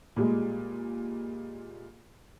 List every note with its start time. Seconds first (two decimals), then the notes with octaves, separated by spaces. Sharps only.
0.16 A#2 G3 G#3